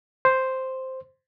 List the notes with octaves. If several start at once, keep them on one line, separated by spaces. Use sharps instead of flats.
C5